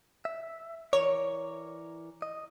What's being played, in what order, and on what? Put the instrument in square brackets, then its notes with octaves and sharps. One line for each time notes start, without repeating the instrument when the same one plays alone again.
[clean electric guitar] E5
[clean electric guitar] E3 A#4 D5 [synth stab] C#5
[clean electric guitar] D#5